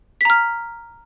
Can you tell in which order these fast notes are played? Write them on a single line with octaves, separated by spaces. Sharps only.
B6 A#5 F6